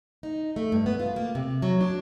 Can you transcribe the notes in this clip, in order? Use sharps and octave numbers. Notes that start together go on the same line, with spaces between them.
D#4
A3
G2
B3
F4
A#3
C3
F#3
D4